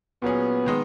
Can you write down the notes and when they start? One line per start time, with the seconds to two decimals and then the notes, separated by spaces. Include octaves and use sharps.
0.22 A#2 F#3 B3 C#4 G#4
0.66 D#3 G#3 D#4